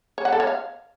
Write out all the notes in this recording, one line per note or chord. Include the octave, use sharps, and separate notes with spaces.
C#5
F#5
A4
C#5
F5